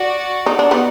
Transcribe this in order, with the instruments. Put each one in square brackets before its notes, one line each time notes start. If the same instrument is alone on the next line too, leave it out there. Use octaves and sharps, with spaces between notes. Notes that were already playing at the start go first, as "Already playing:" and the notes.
Already playing: [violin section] F#4 D5 F#5
[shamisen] D#4
D4
B3 D#4